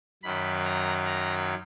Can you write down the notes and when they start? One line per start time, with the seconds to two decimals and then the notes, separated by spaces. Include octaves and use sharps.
0.23 F#2 D#3 F#3 B5
0.65 A#5
1.05 A#5